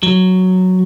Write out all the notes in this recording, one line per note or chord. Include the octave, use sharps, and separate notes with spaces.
F#3